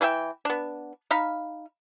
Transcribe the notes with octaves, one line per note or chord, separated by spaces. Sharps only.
E3 A3 E5 G5
B3 D4
D#4 F5 B5